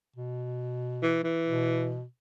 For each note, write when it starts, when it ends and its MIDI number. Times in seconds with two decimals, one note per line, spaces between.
0.16 1.34 47
1.02 1.21 52
1.24 1.97 52
1.46 2.03 47